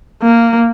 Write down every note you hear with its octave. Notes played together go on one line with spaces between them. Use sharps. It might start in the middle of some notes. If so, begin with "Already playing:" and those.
A#3